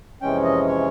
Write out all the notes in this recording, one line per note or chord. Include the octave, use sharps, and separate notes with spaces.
F2 C3 E3 G#3 C#4 G5
D#5
C#5